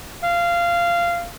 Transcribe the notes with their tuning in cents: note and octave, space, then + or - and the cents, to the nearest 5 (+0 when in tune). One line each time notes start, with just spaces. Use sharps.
F5 -15